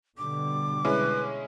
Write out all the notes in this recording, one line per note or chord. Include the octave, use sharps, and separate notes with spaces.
B2 D3 G3 D6
G#3 C#4 E4 B4